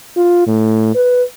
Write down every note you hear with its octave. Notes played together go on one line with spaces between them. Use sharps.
F4
A2
B4